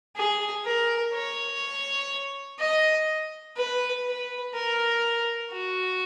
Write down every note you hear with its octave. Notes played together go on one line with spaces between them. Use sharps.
G#4
A#4
C#5
D#5
B4
B4
A#4
F#4